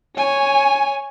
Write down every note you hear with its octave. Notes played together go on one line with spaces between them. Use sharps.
C#5 G#5